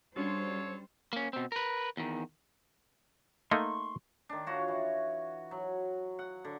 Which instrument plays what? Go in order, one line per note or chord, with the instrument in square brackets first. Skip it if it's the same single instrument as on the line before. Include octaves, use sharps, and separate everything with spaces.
[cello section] G3 C5 [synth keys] C#4 D4 F#4 [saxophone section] F4 A4 C#5
[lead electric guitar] A#3 C#4
B2 C4
A#4 B4
E2 D#3
[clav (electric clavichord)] A3 A#3 D#4 [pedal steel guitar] C6 C#6
[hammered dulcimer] D#3 D4
F4 F#4 C#5
E3
F#3
F#5
D3